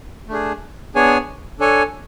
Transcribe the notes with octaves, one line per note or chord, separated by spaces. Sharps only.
A3 D4 G#4
B3 D4 G#4 C#5 G#5
D4 A4 C#5 G#5